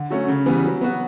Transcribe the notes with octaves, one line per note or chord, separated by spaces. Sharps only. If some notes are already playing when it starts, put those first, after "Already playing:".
Already playing: D3
F#3 A3 C#4
C#3
E3 G3 B3
F#3
B3 F#4